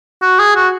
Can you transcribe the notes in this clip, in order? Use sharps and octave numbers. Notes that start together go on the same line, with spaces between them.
F#4
G#4
F#4